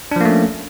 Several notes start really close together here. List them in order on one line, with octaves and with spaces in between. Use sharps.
D4 F3 A#3 A3 C#4